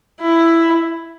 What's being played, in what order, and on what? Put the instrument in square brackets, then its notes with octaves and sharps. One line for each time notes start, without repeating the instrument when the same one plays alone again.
[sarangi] E4